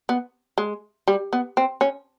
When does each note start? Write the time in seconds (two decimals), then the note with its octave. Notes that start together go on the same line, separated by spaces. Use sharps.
0.09 B3
0.58 G#3
1.08 G3
1.33 B3
1.57 C4
1.81 C#4